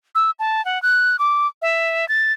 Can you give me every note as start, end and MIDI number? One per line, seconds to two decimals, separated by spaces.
0.15 0.31 88
0.39 0.64 81
0.65 0.81 78
0.83 1.17 90
1.19 1.47 86
1.62 2.08 76
2.09 2.33 93